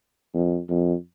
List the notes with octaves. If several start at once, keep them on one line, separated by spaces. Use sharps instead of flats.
F2
F2